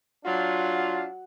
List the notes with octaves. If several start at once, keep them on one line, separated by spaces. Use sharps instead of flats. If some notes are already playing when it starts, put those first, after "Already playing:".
F#3 D4 F4